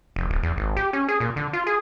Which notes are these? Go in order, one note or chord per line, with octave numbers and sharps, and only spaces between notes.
F1
D1
E2
G#1
G4
C#4
G#4
A#2
D3
F4
G#4